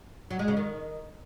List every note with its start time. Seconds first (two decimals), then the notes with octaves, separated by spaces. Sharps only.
0.31 F#3
0.39 G#3
0.48 C#3
0.57 D#3